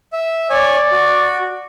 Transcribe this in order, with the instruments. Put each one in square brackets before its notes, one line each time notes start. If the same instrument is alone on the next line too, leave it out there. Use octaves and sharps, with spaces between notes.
[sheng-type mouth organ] E5
[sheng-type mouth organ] C#5 G#5 [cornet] D5
[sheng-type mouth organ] F#4